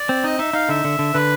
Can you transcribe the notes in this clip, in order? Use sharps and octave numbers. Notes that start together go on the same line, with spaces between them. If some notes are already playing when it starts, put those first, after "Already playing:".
Already playing: D5
C4
D#4 D#5
D#4 E5
D#4 F5
D3 E5
D3
D3
D3 B4